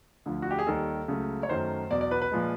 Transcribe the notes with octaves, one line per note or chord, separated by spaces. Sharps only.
D2 D3 F3
F#4
G4
G#4
D#2 D#3 G3 A4
C#2 C#3 F#3 A3
C#5
F#2 D#3 F#3 A3 C5
E2 B2 F#3 D5
D5
B4
B4
A#2 F3 G#3